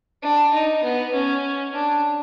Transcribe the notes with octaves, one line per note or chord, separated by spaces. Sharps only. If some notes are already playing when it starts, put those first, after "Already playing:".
D4
D#4
B3
C#4
D4